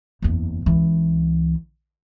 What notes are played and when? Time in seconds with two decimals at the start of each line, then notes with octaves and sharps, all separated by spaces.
0.22 F#1 E2
0.66 C#2 E3